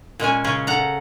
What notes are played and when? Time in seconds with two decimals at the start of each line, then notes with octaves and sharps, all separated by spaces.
0.20 A#2 G#3 C#4 G#5
0.44 C#3 C#4 G#4
0.67 A4 F#5 A#5